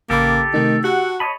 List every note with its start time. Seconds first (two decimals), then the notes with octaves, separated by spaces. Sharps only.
0.10 A1 C#3 A#3 G4 A4 B5
0.54 C3 D#3 A3 D#4
0.84 F#4 G4 F#5 A5 E6
1.20 C#5 D#5 A5 B5